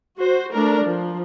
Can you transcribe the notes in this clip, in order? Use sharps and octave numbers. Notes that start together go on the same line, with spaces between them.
F#4 C5
A3 D4 A#4
F3